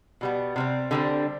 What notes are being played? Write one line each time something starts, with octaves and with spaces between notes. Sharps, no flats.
B2 G3 B3
C3 G3 C4
D3 G3 C4